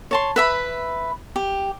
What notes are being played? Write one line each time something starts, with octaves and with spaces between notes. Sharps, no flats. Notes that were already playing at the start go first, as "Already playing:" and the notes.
C#5 A5 C6
B4 E5 B5
G4